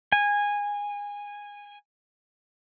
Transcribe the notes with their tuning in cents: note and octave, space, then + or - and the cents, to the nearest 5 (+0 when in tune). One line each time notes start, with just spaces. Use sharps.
G#5 -15